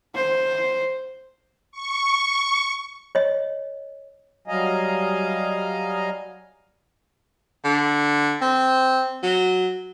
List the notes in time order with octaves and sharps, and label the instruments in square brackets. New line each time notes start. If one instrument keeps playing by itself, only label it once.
[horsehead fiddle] C5
[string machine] C#6
[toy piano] C#5 D#5
[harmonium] F#3 G3 D#5 F5 G#5 A#5
[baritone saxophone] D3
C4
F#3